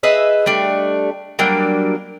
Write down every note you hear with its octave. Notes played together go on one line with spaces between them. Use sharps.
G#4 B4 D#5 E5
G3 A3 D4
F#3 G3 A#3 D4